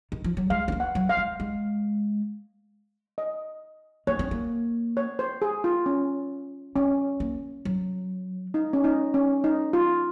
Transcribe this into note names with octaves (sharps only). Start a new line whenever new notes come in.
D#3
F3
F#3
G#3 F5
C4
A#3
F#5
F#3
F5
G#3
G#3
D#5
A#3 C#5
C4
A#3
C#5
C5
G#4
F4
C#4
C4 C#4
A#3
F#3
D#4
C#4
D#4
C#4
D#4
F4